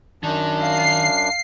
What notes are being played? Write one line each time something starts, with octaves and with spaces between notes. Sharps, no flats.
F#2 D#3 D4
F5 C7